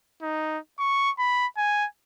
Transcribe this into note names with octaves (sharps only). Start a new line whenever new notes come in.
D#4
C#6
B5
G#5